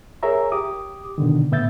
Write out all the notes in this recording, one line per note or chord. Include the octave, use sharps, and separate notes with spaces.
G#4 A#4 C#5 E5 A#5
G4 D6 D#6
B2 D3 D#3
A2 B3 E5 G6 A6